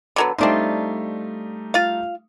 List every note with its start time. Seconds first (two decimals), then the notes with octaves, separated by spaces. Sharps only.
0.16 D3 F#3 B3
0.38 G3 A3 C4 D4 D#4 F4
1.74 F4 F5